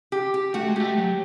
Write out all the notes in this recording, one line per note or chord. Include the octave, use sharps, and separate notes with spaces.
G4
G4
A3 F#4
G#3
A3 G4
F#3